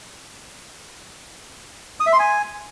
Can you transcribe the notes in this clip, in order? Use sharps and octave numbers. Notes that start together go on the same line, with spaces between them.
D#6
E5
C6
G#5